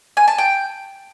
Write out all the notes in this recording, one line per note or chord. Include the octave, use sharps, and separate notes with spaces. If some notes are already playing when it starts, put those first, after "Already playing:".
G#5
A5
G5